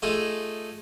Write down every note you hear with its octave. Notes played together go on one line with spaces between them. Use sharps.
A3 D#4 F4 G#4 A4